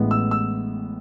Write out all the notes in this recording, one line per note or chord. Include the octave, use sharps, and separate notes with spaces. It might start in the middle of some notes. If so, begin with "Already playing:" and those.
Already playing: A1 A2 G#3 B3
E6
E6